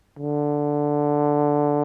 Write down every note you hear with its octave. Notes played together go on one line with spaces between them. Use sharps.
D3